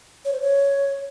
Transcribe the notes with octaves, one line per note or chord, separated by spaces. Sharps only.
C#5
C5
C#5